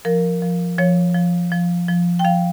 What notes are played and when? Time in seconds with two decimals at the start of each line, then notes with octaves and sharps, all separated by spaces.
0.05 F3 A#4
0.42 F3
0.78 F3 C#5
1.14 F3
1.52 F3
1.88 F3
2.19 G5
2.25 F3 F5